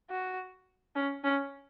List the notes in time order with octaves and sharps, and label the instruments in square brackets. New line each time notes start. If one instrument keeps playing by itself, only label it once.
[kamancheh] F#4
C#4
C#4